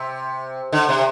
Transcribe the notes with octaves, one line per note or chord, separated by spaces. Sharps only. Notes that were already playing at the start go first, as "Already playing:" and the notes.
Already playing: C3
D3
C3